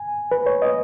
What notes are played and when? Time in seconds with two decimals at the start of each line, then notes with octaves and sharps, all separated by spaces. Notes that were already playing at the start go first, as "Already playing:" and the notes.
Already playing: G#5
0.31 B4
0.46 C#5
0.62 D#5